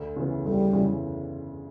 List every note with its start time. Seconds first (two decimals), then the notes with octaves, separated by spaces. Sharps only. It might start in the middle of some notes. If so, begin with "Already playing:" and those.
Already playing: D2
0.16 C#3 E3 B3
0.45 D2 G3
0.73 C#3 E3 B3